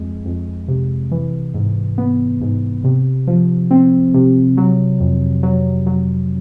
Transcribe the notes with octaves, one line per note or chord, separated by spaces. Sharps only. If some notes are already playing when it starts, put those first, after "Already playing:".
Already playing: F2 G#3
F2
C3
E3
G#2
B3
G#2
C3
F3
C4
C3
F#3
F2
F#3
F#3